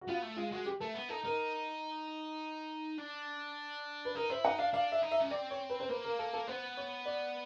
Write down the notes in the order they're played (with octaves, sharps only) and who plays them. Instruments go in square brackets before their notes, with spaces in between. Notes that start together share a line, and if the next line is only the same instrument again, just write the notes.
[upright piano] F#4
[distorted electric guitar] B3 [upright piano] F4
[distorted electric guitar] A3
[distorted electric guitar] G#3 [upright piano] F4
[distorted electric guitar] G#3 [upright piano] F#4
[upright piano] G4
[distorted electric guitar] A3 [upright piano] A4
[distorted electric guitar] B3
[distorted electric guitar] D#4 [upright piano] A4
[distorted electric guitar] D#4 [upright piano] A#4
[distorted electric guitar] D4
[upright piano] B4
[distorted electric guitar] D#4 [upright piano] A#4
[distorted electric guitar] E4 [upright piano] C5
[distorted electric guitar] D#4 [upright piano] F#5
[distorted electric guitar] D4 [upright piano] F5
[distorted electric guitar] D4 [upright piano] F5
[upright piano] E5
[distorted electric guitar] D#4
[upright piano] E5
[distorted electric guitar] C#4
[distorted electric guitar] C4 [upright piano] D5
[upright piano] C#5
B4
C5
[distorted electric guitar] A#3 [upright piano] B4
[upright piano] A#4
A4
A4
[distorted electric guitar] B3 [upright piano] C5
[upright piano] C#5
D5